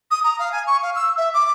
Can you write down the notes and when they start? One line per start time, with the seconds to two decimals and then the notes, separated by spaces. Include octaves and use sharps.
0.11 D#6
0.24 A#5
0.39 F5
0.52 G#5
0.67 C#6
0.83 F5
0.96 E6
1.17 E5
1.34 D6